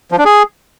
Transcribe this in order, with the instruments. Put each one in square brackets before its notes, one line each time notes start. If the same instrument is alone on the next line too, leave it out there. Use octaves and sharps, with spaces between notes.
[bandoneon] F3
D4
G#4